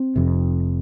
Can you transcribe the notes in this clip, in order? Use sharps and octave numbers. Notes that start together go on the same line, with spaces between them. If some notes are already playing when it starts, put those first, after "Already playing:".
Already playing: C4
F1 F2 C3